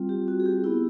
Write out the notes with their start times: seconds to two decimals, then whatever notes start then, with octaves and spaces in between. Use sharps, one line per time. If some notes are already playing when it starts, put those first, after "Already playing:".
Already playing: G3 C4 F4
0.09 G4
0.28 F#4
0.40 G#4
0.46 G4
0.64 B3 E4